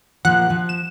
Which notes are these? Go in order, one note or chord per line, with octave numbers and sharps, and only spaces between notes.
A#2 F3 F#5 F#6
F3
E7